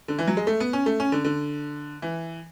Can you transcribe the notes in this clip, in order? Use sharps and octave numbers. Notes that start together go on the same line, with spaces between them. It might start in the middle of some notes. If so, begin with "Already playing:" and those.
D3
E3
F#3
G#3
A3
B3
C#4
A3
C#4
D3
D3
E3